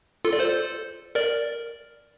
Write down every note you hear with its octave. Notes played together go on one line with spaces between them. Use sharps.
F4 A4
D5
A4 C5
A#4 D5